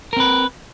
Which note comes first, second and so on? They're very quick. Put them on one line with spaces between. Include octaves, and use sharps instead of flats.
A#4 C4 B4